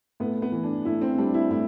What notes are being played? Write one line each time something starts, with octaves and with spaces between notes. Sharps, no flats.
A2 B3
B3
E3
D4
A2 E4
C4
G3 D4
E4
A2 E4